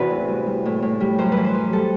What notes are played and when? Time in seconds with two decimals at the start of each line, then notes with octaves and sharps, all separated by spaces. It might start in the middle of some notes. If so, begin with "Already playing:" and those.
Already playing: E2 C3 E3 D4 E4 F#4 B4
0.10 A2
0.28 G3
0.46 G3
0.66 A2
0.82 A2
1.00 G3
1.18 F#2 C5
1.32 B4
1.37 E3
1.44 C5
1.55 F#2
1.73 G3 A4